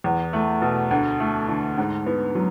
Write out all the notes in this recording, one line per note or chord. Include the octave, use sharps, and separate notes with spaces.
E2
A3
B2
D2
A3
D3
G#2
B3
F#3